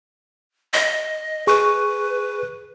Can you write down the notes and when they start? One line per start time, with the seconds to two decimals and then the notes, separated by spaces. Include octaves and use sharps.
0.74 D#5
1.47 G#4 B4 C#6